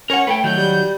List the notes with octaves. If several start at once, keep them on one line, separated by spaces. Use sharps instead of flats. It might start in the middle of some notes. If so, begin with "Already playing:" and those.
C#4 A#4 C#5 F#5
A3 B4 F#5 G5
D#3 F#3 G6
G3